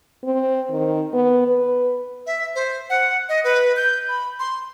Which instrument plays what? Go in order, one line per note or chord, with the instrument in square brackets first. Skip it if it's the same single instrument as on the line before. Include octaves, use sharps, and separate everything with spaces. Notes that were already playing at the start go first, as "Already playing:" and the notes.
[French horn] C4
D#3
B3
B4
[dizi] E5
C5
F#5
D#5
B4
G6
B5
C6